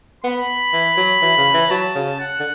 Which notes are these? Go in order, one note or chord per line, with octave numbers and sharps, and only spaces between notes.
B3 B5
E3
F#3
E3
C#3
E3
F#3 A5
C#3
F#5
D3